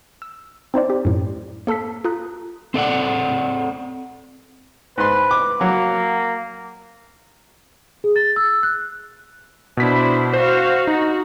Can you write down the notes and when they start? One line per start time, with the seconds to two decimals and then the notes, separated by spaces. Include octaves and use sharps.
0.22 E6
0.74 C4 D#4 C5 D5
0.90 G4
1.05 F#2 A2
1.67 A#3 A4 A5 E6 B6
2.05 F4 A4 A#5 D#6 F#6
2.74 C4 A4 D5 F#5
4.98 G#2 B4 C6
5.31 D6
5.61 F#3 A#3
8.04 G#4
8.16 A6
8.36 E6
8.63 F#6
9.77 B2 D4 E4 C5 B6
10.34 F#4 C5 F5
10.87 D#4 F#4